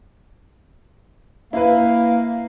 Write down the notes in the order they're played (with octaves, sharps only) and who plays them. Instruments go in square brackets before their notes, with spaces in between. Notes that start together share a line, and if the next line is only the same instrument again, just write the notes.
[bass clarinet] A#3 [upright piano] E4 B4